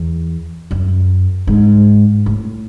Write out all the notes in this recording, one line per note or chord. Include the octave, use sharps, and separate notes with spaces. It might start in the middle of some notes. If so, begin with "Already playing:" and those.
Already playing: E2
F#2
G#2
A2